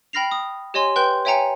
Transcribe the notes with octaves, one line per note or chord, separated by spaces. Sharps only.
G5 B5 F6 A#6 C7 F7
D#6
G4 C#5 D#5 G#5 C6
B4 G5 C6 F#6 G6
C#5 E5 G5 G#5 A#5 C#7